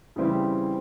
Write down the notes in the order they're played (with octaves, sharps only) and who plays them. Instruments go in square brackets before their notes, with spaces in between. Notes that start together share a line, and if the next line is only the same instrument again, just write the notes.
[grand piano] C#3 E3 G3 C4